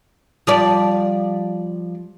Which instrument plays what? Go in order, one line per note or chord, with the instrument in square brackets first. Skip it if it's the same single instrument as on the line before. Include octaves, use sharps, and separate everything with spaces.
[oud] F3 G3 D5